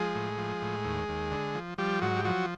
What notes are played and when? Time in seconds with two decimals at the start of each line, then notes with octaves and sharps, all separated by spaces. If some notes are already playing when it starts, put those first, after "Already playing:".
Already playing: F3 G#3 G#4
0.15 A2
0.38 F3
0.62 A2
0.84 D#2
1.08 D#2
1.31 D3
1.55 F3
1.78 F3 G3 G4
2.02 G#2 F#3 F#4
2.16 G4
2.25 F3 F#3 F#4